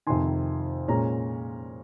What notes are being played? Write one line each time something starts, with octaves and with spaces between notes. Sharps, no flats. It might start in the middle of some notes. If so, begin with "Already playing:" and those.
F2 C3 D#3 G#5 C6
A#2 G#3 C#4 A#5